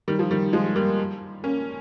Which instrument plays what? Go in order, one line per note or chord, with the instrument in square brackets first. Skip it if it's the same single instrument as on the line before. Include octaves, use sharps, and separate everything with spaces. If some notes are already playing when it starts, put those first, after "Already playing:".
[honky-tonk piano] D#3 G3
F3
D#3 G3
F3 G#3
G3 A#3
A#3 C#4